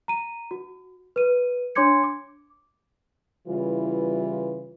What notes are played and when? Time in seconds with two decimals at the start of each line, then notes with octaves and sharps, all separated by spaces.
0.08 A#5 D#7
0.51 F#4
1.16 B4 D#7
1.75 D4 C#5 C6 D6 G#6 C#7
2.03 D6
3.48 C#3 E3 G3 E4 F4 B4